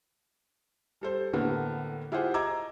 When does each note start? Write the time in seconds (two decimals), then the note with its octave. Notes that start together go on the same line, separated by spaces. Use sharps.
1.01 G3 A4 C5
1.33 A2 D3 A#3 B3
2.12 E4 F4 G4 G#4 C5 F#5
2.34 D#5 A#5 D6 E6 G#6